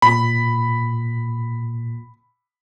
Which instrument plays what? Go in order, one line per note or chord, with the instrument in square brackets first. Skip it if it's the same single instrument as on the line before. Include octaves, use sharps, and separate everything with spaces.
[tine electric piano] A#2 [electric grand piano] B5